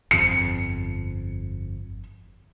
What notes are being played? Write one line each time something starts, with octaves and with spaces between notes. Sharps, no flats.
G1 F2 C#7